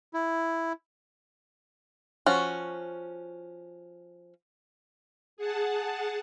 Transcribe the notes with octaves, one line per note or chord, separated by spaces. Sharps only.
E4
F3 C#4 F#4
G#4 F#5 A5